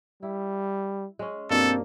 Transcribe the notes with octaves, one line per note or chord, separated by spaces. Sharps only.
G3 E4
G#3 C#4
G2 B2 F3 A#3 C4 A4